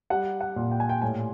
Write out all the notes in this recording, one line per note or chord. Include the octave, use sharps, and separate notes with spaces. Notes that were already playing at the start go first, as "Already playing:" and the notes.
G3 F#5
F#5
A#2
G5
G#5
G5
A2 G#5